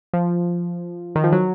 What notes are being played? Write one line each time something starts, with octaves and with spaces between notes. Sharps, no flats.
F3
D#3
F3
F#3